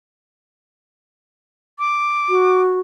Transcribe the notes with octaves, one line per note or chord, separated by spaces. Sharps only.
D6
F#4